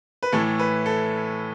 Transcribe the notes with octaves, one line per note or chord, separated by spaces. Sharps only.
B4
A2 E3 A3 A4
B4
A4